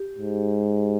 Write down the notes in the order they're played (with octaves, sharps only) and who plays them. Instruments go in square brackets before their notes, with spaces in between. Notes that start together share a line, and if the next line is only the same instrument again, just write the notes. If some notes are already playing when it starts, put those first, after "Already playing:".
Already playing: [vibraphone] G4
[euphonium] G#2